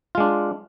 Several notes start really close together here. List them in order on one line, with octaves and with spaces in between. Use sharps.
F4 G#3 D4